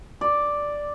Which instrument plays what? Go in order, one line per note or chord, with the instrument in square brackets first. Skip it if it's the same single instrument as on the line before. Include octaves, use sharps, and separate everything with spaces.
[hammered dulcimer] D5